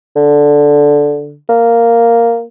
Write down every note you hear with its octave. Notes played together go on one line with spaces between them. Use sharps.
D3
A#3